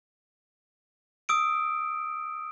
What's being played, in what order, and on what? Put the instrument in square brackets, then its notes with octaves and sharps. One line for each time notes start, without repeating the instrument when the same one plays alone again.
[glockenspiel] D#6 E6 D7